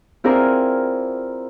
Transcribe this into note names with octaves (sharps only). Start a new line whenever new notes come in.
C4 E4 F4 G#4 A#4 D5